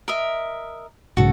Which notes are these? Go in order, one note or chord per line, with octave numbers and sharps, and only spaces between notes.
A#4 D#5 E5
B1 G#2 C#3 F#4 A4